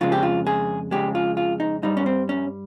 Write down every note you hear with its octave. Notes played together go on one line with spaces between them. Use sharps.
F2 C#3 G#3 F4
G4
F4
G#4
F2 C#3 G#3 G4
F4
F4
D#4
G2 G3 D#4
C#4
C4
C#4